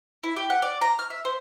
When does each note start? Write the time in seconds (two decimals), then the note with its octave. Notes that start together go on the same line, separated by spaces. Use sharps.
0.24 E4
0.36 G4
0.50 F#5
0.62 D5
0.81 A#5
0.99 F6
1.10 E5
1.25 C5